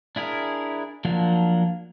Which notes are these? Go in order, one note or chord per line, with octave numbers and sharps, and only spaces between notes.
D4 E4 G#4 A#4
F3 F#3 A#3 D4